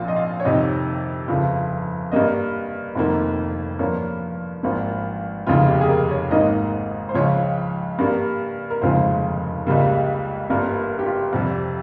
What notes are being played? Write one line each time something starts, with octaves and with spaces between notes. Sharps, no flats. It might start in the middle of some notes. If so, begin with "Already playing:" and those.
Already playing: A#1 A#2 F3 F5
D#5
F5
C#5
F2 C3 D#3 D#5
G1 F2 C#3 F3
G2 G3 A#3 D#5
F1 F2 D#3 A#3
G2 F3 A#3 C#5
G#1 G2 F3 A#3
F1 D#2 C#3 F3 F4
G4
G#4
A#4
C#5
G#1 G#2 D#3 A#3 D#5
C5
C#2 C#3 F3 C#5
G2 G3 A#3
A#4
F1 D#2 C#3 F3 G#3 C5
C#2 C#3 G3 A#3
G1 G2 G3 A#3 A#4
A#4
G4
F4
F2 C3 G3